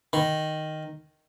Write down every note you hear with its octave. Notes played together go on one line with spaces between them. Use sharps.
D#3